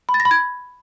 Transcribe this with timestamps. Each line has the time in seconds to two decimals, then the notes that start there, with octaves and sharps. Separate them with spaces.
0.09 B5
0.14 A6
0.20 A#6
0.25 B5
0.31 G#6